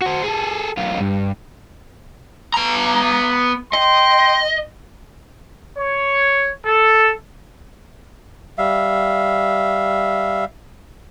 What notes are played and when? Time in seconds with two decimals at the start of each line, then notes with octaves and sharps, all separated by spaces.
0.01 F#4 C5
0.23 G#4 A4
0.77 B1 F4
1.01 G2
2.54 B3 A#5
3.73 D#5 G5 C6
5.77 C#5
6.65 A4
8.58 G3 E5 F5